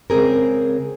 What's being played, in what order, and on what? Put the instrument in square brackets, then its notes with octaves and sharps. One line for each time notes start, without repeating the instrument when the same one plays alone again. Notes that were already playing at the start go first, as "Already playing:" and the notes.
[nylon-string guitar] C#3 G#3 C4 G#4 A#4